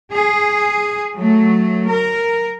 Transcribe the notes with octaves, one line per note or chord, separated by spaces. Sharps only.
G#4
F#3 A3
A#4